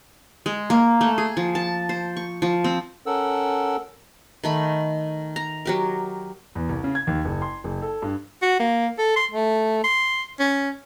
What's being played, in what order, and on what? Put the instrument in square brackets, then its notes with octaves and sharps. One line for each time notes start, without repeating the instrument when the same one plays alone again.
[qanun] G#3
A#3
A3
G#4
F3
A5
C5
C#6
F3
C4
[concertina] C#4 A4 A#4 F#5 E6
[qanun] D#3 A3 B5
A#5
F#3 G4 A#4
[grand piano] E2
C2
C#3
G#6
D#2
F#1
C6
F#1
A4
G2
[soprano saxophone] F#4
A#3
A4
C6
A3
C6
C#4